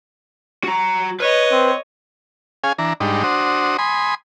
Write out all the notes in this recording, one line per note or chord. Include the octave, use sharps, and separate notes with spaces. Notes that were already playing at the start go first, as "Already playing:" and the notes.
F#4 A#5
B4 C#5 D#5
C4
C#4 G#4 F5 G#5
E3 D4 A#5
G#2 G3 D4 D#4
D4 F#4 C5 D#6
G#5 B5 C6 D#6